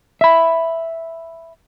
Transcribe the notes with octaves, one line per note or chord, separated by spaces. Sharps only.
E5 B5